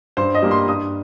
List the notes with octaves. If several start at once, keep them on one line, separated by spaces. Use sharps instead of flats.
G2 C5
D#5
G3 A#3
C6
G2 D#6